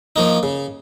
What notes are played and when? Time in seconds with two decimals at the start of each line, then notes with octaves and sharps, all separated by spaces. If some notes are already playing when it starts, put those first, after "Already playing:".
0.16 F3 A#3 D#4
0.43 C#3